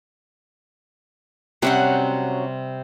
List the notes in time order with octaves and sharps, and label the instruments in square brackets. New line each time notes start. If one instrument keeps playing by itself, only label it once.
[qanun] C3 G3 C4 [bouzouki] F#3 C#4 F#5